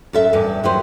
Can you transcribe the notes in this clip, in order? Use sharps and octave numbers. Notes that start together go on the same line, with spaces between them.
F#2 A4 E5
E2 G2
F#3 G4 B4 C5